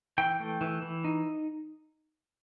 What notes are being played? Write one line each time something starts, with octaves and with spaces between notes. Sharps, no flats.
E3 G5
A3
E3
E3
D#4